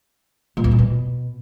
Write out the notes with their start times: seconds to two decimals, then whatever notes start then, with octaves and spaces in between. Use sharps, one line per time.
0.57 A#2
0.64 E2
0.71 F2
0.79 B2